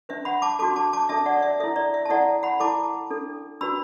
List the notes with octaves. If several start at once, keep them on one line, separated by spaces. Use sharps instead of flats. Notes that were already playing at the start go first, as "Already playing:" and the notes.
D4 B4 E5
F#5 B5
A5 D6
D4 F#4 A4 A5 D6
A5 D6
A5 D6
D4 A4 E5 A5
D5 F#5
D5
E5
E4 A4 E5
D5
E5
A5
E4 A4 D5 F#5
F#5 B5
E4 A4 A5 D6
D4 A4
D4 F#4 B4 B5 E6